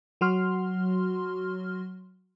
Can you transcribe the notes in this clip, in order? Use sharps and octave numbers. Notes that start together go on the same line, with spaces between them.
F#3 F#4 C6 F6